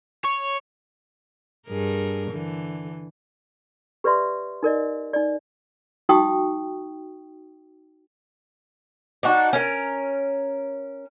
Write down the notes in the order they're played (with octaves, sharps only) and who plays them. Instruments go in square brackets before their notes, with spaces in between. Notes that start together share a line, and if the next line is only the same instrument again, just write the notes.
[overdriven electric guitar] C#5
[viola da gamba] G2 G#4 A#4
D3 E3
[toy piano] G4 B4 D5 E5 C6
D#4 A#4 D5 D#5
D#4 D5
D#4 F#4 G5 C#6 D#6
[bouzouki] D4 D#4 F#4
C#4 A#4